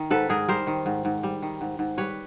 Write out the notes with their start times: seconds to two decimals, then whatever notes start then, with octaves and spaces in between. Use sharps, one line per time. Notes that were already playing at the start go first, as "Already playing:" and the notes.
Already playing: D#3
0.11 G#2 A4 B4
0.29 G#2 G#4 A#4
0.48 G3 A#4 C5
0.67 D#3
0.86 G#2
1.05 G#2
1.23 G3
1.42 D#3
1.61 G#2
1.79 G#2
1.98 G3 B4 C#5